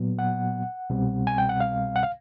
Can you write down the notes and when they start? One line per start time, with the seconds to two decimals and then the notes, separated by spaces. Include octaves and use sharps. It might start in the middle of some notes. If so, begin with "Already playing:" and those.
Already playing: A#2 F#3 B3
0.19 F#5
0.90 C2 B2 G3 C4
1.27 G#5
1.38 G5
1.49 F#5
1.60 F5
1.96 F#5
2.03 F5